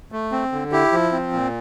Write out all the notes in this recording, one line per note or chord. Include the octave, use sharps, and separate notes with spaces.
A3
C4
D3
E4 G4
F3
C4
A#2